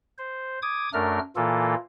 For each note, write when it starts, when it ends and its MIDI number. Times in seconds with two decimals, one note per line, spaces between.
0.18 0.59 72
0.62 0.89 86
0.62 0.89 87
0.62 0.89 92
0.93 1.19 42
0.93 1.19 57
0.93 1.19 62
0.93 1.19 70
0.93 1.19 89
1.36 1.75 46
1.36 1.75 52
1.36 1.75 58
1.36 1.75 65
1.36 1.75 69